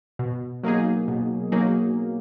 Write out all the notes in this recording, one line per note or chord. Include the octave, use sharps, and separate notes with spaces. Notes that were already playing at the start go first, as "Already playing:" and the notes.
B2
F#3 A#3 D#4 G#4
B2
F#3 A#3 D#4 G#4